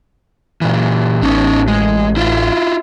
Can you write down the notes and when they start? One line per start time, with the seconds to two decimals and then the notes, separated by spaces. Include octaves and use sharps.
0.61 A#2 E3
1.22 A1 C#4 D#4
1.68 G#3
2.16 E4 F4